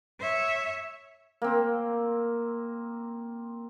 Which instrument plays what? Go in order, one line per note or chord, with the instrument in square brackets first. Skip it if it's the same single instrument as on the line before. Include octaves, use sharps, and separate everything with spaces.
[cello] C#5 E5
[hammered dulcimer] A#3 C4